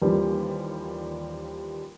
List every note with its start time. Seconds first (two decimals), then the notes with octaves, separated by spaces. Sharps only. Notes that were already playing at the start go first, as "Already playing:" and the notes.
0.02 D#2 E3 F3 G3 A#3 C4